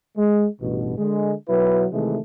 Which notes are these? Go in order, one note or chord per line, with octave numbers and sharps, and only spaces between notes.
G#3
A1 G2 B2
D3 G#3
B2 F#3 E4 B4
C3 D#3 E3 G#3 A3